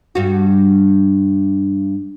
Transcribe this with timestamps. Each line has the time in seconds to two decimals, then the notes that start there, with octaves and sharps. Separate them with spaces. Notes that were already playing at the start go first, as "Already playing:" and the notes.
0.15 G2 F#4